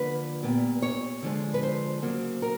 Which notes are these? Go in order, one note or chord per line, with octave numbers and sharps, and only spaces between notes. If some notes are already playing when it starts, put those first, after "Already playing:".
Already playing: D3 F3 A#3 B4
A#2 G3 B3
C#5
D3 F3 G#3
B4
C5
C#3 F#3 A#3
A#4